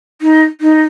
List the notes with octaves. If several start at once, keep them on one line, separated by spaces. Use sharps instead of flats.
D#4
D#4